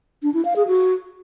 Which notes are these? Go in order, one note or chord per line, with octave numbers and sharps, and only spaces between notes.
D4
E4
F5
G#4
F#4